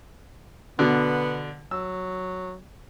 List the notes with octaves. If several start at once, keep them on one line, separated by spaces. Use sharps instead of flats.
B2 D3 B3
F#3 E6